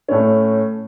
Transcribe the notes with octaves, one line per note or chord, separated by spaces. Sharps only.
A2 A3 C#4